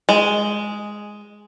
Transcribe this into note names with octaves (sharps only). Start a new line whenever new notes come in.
G#3